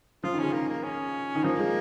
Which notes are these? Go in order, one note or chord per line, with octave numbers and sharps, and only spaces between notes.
F3 F4
D#3
C#3 C#4
D#3 A#3
A#3
C#4
D#3
F3 A#3
G#3